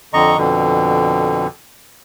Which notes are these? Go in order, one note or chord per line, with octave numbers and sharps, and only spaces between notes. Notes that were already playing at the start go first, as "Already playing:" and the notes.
F2 D3 D#5 A#5 C#6
F2 B2 D3